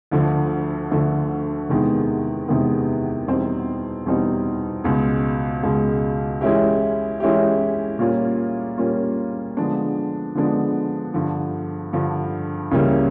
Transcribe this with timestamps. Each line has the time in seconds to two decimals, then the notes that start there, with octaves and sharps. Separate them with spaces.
0.11 D2 D3 F3 A3
0.91 D2 D3 F3 A3
1.69 E2 C3 D#3 G#3 B3
2.48 E2 C3 D#3 G#3 B3
3.27 E2 B2 G3 C4 D#4
4.06 E2 B2 G3 C4 D#4
4.84 C#2 B2 G#3
5.63 C#2 B2 G#3
6.41 E3 G#3 C#4 E4 G4
7.20 E3 G#3 C#4 E4 G4
7.99 A#2 G3 A#3 C#4 F4
8.78 A#2 G3 A#3 C#4 F4
9.57 D3 F3 G#3 B3 D4
10.35 D3 F3 G#3 B3 D4
11.14 G2 D3 F3
11.93 G2 D3 F3
12.71 C#2 C#3 E3 G3 A#3